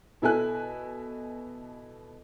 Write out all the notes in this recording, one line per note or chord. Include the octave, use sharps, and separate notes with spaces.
B2 E4 A4 G#5 F#6